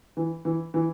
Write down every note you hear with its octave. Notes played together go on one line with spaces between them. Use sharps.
E3
E3
E3